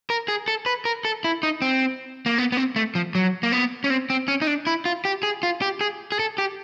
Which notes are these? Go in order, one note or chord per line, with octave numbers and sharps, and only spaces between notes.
A#4
G#4
A4
B4
A#4
A4
E4
D#4
C4
A#3
B3
B3
C4
A3
F3
F#3
A#3
B3
C#4
C4
C4
C#4
D#4
D4
E4
F4
G4
G#4
F4
G4
G#4
G#4
A4
G4